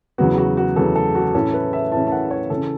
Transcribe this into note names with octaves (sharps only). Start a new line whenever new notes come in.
E2 C#3 F#3 B3 F#4
F#4
F#4
E2 C#3 F#3 B3 A4
A4
F#4
A2 E3 C#4 A4
B4
E5
A2 E3 C#4 A5
A5
F#5
C#5
C#3 E3 C#4 A4